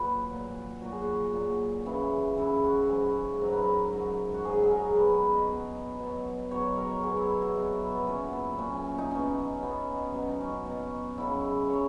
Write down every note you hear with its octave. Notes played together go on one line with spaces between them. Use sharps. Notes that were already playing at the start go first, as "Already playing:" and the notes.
Already playing: A#2 F#3 B4
A#2 F#3
A#2 F#3 F#4
G#4
F#4
A#2 F#3
F#2 C#3 E3
F#2 C#3 E3 E4
F#4
G#2 F#3 G#4
G#2 F#3 A#4
B4
A#4
G#2 F#3
F#4
G#2 F#3 G#4
G#4
A#4
B2 F#3 B4
B4
D#5
B2 F#3
B2 F#3
B2 F#3 C#5
A#4
B2 F#3 G#4
E4
E4
F#4
B2 F#3 F#4
E4
B3
A#2 F#3 C#4
B3
A#2 F#3 C#4
C#4
C#4
D#4
B2 F#3 C#4
B2 F#3 B3
B2 F#3 C#4
D#4
C#4
B2 F#3
F#2 C#3 F#3 E4
C#3 F#3 C#5